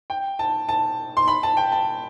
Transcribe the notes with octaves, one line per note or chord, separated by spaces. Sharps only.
G5
A5
A5
C6
B5
A5
G5
A5